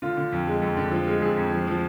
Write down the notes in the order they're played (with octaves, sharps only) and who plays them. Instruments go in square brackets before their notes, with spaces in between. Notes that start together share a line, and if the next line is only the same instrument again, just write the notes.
[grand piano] D3 F4
D3
F2
G#3
F2
D3
F3
G#3
F2 G#4
F2
F3
F3